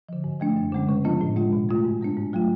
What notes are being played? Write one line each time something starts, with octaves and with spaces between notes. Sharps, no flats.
D3 F3
G#2
F3 A3 D4
F#2
D3 G#3 C#4
C#3
F3 B3 D4 F4
A2
G#3 D4 F4
B2
A3 F4
G#2
G#3 B3 D4
G#2
F#3 A3 F4